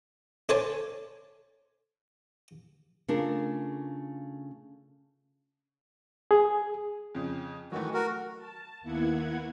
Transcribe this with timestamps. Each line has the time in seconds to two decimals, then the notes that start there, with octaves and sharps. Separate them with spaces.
0.49 D4 A4 C5 C#5 G#5 A5
3.08 C#3 A3 D4 F4 A#4
6.31 G#4
7.15 F2 C#3
7.72 D#3 E3 F#3 A3 F#4
7.94 F#4 A#4
8.37 A5
8.81 D#2 A#3 B3 E4 F#5 G#6